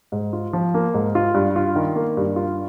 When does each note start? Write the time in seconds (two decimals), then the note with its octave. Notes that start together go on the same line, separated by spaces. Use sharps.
0.12 G#2
0.33 F4
0.53 F3
0.74 A#3
0.94 G#2
1.15 F4
1.34 G2
1.56 F4
1.76 D#3
1.96 A#3
2.17 G2
2.36 F4